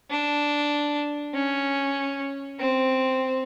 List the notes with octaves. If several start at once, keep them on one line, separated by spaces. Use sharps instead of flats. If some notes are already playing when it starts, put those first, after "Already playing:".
D4
C#4
C4